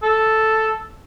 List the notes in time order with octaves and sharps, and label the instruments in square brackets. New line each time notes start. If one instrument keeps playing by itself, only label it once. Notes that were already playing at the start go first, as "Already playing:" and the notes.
[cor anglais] A4